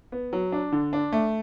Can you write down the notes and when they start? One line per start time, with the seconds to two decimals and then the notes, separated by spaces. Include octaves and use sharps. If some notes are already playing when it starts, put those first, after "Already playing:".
0.12 B3
0.33 F#3
0.52 D4
0.72 D3
0.93 D4
1.12 A3